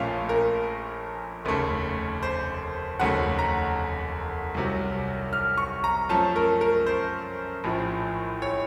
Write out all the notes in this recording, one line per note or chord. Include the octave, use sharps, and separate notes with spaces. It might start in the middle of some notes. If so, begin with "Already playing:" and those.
Already playing: A#1 A#2 A3 C#4 F5
A#4
F1 D#2 C#3 A3
C5
F1 D#2 C#3 F#3 A3 F#5
A#5
C2 C3 F#3
F6
C#6
A#5
F#2 F3 A3 C#4 A5
A#4
A#4
C5
A#1 A2 F3
C#5